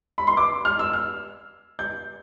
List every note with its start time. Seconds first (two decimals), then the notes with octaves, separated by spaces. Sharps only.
0.18 B5
0.27 C6
0.37 D6
0.65 F6
0.79 E6
0.93 F6
1.79 G6